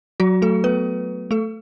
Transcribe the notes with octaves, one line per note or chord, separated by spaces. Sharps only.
F#3 F#4
A3 A4
B3 B4
A3 A4